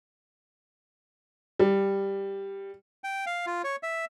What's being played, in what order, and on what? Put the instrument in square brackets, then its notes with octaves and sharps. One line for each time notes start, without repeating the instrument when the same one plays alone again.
[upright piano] G3
[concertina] G5
F5
F4
C#5
E5